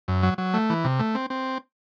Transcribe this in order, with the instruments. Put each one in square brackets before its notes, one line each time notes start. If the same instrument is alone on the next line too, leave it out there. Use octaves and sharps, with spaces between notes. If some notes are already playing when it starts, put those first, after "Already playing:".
[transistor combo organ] F#2
F#3
F#3
A3
E3
C3
A3
C4
C4